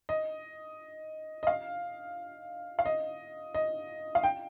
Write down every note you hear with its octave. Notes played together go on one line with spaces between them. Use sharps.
D#5
D#5
F5
F5
D#5
D#5
F5
G5